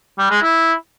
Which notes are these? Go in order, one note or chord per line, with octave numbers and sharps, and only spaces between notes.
G3
G#3
E4